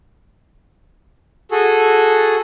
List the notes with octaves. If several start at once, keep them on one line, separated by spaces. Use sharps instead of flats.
F#4 G#4 A4